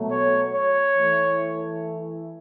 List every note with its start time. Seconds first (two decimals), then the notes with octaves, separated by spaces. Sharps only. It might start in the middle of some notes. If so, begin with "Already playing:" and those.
Already playing: B2 F#3 A3
0.11 C#5
0.55 C#5
0.98 E3 A3 E4